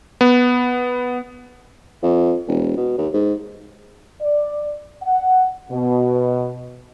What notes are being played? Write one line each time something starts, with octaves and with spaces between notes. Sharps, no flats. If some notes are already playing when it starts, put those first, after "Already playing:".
B3
F2
E1
B2
D#2
G#2
D5
F#5
B2